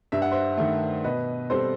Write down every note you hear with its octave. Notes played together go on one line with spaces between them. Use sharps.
G2 E5
F#5
C5 E5
D#3 A3
B2 B4 D#5
G3 C4 A4 C5